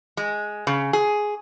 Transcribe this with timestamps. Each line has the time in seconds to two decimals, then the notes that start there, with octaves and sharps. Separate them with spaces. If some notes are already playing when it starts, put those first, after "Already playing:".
0.17 G#3
0.67 C#3
0.93 G#4